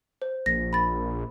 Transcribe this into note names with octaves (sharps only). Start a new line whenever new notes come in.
C5
A#1 A#6
B5 A6